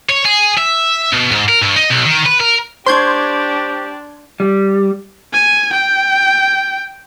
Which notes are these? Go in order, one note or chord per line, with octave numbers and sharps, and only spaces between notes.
C#5
G#4
E5
B2
G#2
A#4
G2
D#4
B1
D#3
B4
A#4
D4 G4 C5 C6 C#6 G6 G#6
G3
G#5
G5